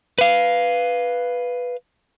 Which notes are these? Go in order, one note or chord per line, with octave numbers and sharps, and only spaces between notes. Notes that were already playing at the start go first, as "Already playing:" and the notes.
B4 F5